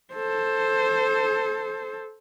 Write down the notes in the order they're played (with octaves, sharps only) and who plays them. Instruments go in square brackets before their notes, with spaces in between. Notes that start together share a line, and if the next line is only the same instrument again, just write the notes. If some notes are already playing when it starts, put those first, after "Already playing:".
[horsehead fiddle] A4 C5